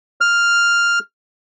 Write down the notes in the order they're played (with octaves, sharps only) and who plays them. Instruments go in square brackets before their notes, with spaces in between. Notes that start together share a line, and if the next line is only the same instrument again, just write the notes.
[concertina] F6